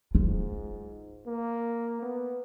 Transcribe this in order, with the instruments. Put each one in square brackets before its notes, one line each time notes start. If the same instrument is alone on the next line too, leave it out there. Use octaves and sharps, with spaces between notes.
[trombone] G#2 [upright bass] F4
[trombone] A#3
B3